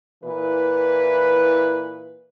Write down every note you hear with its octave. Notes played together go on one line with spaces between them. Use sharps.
A#2 E3 E4 B4